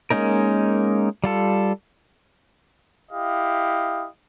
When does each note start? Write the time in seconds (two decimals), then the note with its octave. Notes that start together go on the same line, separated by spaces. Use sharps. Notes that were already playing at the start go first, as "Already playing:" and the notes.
0.10 G#3 A#3 C#4 D#4 A#4
1.24 G3 F4 A4
3.11 E4 G4 D#5 F5